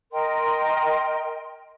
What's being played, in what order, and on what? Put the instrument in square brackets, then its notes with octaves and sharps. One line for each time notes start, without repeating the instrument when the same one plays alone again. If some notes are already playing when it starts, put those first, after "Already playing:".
[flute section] A#4 D#5 G5 C6